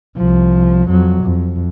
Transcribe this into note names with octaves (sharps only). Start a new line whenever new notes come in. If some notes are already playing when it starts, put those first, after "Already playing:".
C2 F3
F2 F#3
F2